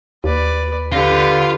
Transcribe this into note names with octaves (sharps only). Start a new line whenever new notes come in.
D#2 B4 D5
D3 F4 G4 B4